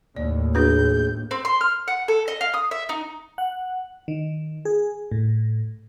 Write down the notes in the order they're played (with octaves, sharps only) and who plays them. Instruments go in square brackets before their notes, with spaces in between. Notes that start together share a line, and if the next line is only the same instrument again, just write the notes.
[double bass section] D#2 A2 [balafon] D5
[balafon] D4 F#4 B4 [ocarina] G#4 [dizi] G6
[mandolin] C4
C6
F6
F#5
A4
D#5
F5
D#6
E5
D#4
[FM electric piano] F#5
D#3
G#4
A2